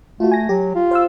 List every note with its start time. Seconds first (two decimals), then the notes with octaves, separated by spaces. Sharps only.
0.20 A3 F4 F#4
0.32 G#5 A#6
0.49 F#3 G4
0.75 F4
0.91 C5 F5 E6